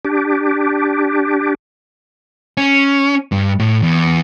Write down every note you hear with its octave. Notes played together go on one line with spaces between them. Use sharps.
D4 G4
C#4
G2
A2
E2